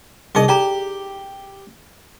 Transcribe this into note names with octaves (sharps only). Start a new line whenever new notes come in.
C2 D#4 G#4 D#5 D6
G4 A4 D5 A#5